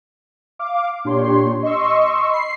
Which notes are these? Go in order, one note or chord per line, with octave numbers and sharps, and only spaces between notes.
F5 D6
A#2 D4 G4 C#5 C6
D#5 C6 C#6 E6
B5 C7